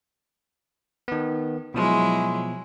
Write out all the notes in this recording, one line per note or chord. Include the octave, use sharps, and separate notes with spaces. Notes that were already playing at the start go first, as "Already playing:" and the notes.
D#3 B3
B2 F3 F#3 G#3 E4